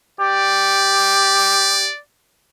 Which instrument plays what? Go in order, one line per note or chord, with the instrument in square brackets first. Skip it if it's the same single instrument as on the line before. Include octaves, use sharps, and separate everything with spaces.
[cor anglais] G4 [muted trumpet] D5